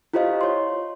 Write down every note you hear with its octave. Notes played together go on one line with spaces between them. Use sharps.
E4 F4 G4 C5 D#5 F5
C#5 C6